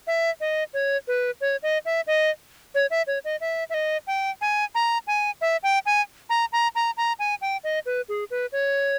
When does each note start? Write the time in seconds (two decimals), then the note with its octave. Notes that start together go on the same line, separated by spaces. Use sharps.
0.07 E5
0.40 D#5
0.74 C#5
1.08 B4
1.41 C#5
1.63 D#5
1.85 E5
2.07 D#5
2.75 C#5
2.91 E5
3.07 C#5
3.25 D#5
3.41 E5
3.70 E5
3.74 D#5
4.07 G5
4.41 G#5
4.75 A#5
5.07 G#5
5.41 E5
5.63 G5
5.86 G#5
6.30 A#5
6.52 A#5
6.75 A#5
6.97 A#5
7.19 G#5
7.42 G5
7.64 D#5
7.86 B4
8.09 G#4
8.31 B4
8.52 C#5